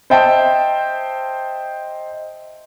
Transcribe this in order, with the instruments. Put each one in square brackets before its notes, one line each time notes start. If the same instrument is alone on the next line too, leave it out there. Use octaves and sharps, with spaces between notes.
[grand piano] C5 D#5 E5 G5 A5